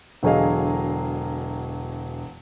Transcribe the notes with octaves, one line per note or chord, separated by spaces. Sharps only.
E1 D3 F#3 G#4 D#5 F5